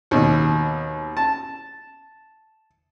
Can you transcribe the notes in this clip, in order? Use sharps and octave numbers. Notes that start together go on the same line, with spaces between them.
D#2 B2
A5